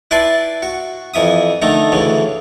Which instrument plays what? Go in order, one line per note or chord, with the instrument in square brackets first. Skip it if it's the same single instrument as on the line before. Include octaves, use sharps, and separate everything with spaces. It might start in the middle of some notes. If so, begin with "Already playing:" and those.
[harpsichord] E4 B4 D5 E5 A5 C6
F#4
F2 E3 E5 D#6
D3 D#3 A3 A#5
D2 C#3 E3